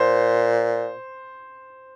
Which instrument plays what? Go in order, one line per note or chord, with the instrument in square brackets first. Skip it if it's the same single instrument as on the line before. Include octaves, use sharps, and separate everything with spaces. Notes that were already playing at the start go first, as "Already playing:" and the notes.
Already playing: [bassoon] A#2 [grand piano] C5